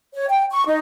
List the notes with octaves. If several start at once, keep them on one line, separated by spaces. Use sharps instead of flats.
C#5
G5
C#6
D#4